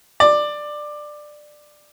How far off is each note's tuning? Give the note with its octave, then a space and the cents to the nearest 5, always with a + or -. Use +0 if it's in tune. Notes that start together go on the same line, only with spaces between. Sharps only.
D5 +15